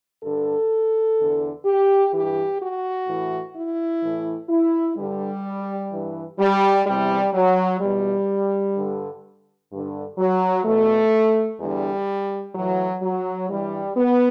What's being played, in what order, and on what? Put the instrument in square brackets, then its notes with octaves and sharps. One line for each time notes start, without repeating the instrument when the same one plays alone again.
[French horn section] G2 D3 A4
E2 D3
G4
G2 E3 G4
F#4
A2 E3
E4
A2 E3
E4
G2 D3 G3
G2 E3
G3
E2 C3 E3 G3
F#3
E2 B2 G3
G2 D3
G2 D3
F#3
E2 B2 A3
E2 D3 G3
A2 E3 F#3
F#3
G2 E3 G3
B3